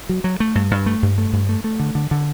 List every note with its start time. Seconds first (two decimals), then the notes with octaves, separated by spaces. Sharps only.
0.09 F#3
0.24 F#3
0.40 A3
0.55 G2
0.71 G2
0.86 A3
1.02 G2
1.18 A3
1.33 G2
1.49 A3
1.64 A3
1.80 D3
1.95 D3
2.11 D3